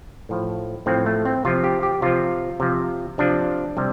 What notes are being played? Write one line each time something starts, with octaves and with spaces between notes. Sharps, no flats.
A2 F3
A2 F3 C4
A3
C4
C3 F3 F4
G4
G4
C3 F3 F4
C3 F3
C3 F3 D4
C3 G3